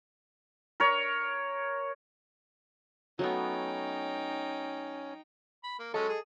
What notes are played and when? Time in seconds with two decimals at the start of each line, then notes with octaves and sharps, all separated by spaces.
0.80 A#4 C#5
3.19 F#3 A3 B3 C#4 D#4 G5
5.64 B5
5.79 A#3
5.94 F#3 G#3 C#4 A4 D#5
6.09 G#4